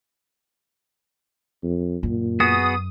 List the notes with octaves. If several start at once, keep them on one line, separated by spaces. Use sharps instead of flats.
F2
F#2 A#2
B3 F#4 G#4 D#6